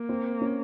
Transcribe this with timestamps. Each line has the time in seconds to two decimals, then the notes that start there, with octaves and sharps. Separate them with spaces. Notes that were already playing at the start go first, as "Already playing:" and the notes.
Already playing: A#3
0.09 C4
0.41 C#4